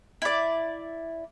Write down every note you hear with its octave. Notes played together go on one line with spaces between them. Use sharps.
E4 D5